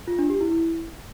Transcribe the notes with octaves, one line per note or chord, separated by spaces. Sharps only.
F4
D4
G4
E4